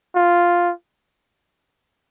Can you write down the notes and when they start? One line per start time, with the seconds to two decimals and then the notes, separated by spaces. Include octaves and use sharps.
0.15 F4